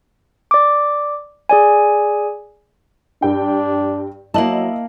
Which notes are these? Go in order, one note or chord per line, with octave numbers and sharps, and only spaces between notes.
D5 D6
G#4 D5 G#5
G2 D4 G5
F#3 A#3 E4 D#5 A5 F#7